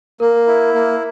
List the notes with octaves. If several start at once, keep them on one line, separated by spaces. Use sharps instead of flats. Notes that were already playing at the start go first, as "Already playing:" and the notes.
A#3 A#4
E4
A#3